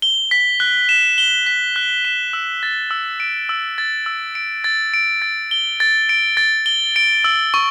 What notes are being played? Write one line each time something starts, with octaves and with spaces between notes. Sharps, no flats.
G7
B6
F#6
E7
G7
B6
F#6
E7
E6
A6
E6
D7
E6
A6
E6
D7
A6
D7
A6
G7
A6
D7
A6
G7
D7
E6
C#6